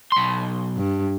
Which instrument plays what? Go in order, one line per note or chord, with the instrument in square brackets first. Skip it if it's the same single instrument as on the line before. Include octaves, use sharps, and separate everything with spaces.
[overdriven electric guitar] B1 C6
[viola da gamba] G2